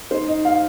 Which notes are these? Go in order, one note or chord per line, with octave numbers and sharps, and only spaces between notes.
D#4 C5
D#4 D#5
F5